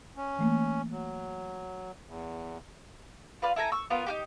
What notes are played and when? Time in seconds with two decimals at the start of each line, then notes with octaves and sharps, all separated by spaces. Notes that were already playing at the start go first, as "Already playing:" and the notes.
0.16 C#4
0.39 E3 A3 A#3
0.91 F#3
2.08 E2
3.42 F4 B4 D5 F5
3.56 E4 A4 G#5 A#5
3.72 C#6 E6
3.90 B3 F4 A#4
4.06 D#4 F#4 G4